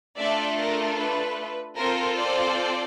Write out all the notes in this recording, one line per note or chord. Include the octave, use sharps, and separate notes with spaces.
A3 D4 F4 A4 D5 E5
A#4
B4
C4 F4 A4 A#4 C5
C5 D5